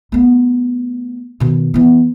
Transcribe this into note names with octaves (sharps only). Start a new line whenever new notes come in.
A3 B3
B2 D#3
E3 B3